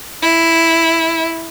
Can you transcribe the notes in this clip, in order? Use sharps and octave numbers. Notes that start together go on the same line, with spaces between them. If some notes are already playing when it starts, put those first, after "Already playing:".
E4